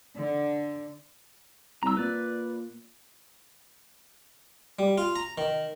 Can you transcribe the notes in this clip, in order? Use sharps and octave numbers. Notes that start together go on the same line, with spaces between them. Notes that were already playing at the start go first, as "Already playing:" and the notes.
D3
C2 A#5 E6
A#2 B4 D5
G3
F4
A#5
D#3